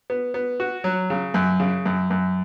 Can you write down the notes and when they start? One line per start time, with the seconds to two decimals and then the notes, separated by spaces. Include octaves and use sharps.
0.10 B3
0.34 B3
0.60 F#4
0.84 F#3
1.10 C#3
1.34 F#2
1.60 C#3
1.85 F#2
2.10 F#2